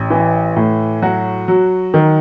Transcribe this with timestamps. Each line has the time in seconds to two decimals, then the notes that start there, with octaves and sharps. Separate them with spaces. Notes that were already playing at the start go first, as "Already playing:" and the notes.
Already playing: A1
0.10 E3
0.56 A2
1.02 F#3 F#4
1.48 F#3
1.94 D#3